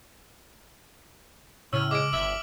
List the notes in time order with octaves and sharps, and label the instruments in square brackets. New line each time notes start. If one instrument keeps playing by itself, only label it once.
[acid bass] A2 [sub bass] C#3 [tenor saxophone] C#4 [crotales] E6 F6
[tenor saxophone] G#3 [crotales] D6 D7
[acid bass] G1 [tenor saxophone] E5 [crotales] F#7